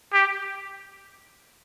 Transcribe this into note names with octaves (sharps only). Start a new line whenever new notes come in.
G4